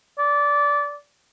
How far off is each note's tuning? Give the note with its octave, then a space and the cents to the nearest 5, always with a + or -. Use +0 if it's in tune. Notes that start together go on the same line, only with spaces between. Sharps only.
D5 -20